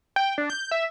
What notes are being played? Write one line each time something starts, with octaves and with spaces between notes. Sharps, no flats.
G5
D4
G6
E5